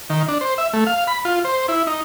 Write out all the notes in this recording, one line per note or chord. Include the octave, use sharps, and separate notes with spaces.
D#3
D4
C5
E5
A3
F5
B5
F4
C5
E4
D#4